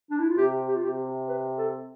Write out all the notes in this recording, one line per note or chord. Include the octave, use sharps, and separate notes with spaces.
D4
E4
F4
C3 G4
G4
F4
C3 G4
B4
A4